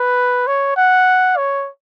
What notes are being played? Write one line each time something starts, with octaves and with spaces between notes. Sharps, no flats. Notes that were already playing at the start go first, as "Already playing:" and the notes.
Already playing: B4
C#5
F#5
C#5